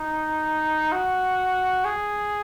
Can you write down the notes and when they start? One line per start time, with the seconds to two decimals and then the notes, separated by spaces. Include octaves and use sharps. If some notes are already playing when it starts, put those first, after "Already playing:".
Already playing: D#4
0.92 F#4
1.85 G#4